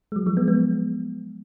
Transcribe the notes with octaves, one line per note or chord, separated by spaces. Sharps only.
G#3
F#3
F3 G#3
G#3 B3
G#3 B3